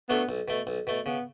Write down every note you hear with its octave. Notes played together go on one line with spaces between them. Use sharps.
F#3 A3 B3 D4 A4
B1
B2 A3
B1
B2 A3
C#3 B3